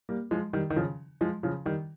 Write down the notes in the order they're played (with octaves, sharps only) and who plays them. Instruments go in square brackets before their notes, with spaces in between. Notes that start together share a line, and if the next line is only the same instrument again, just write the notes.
[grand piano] G3 A#3
F3 G#3
D#3 G3
D#3
C#3 F3
F3 G#3
C#3 F3
D#3 G3